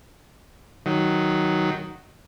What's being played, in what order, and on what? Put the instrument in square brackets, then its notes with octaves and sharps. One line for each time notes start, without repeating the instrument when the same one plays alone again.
[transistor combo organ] D#3 F#3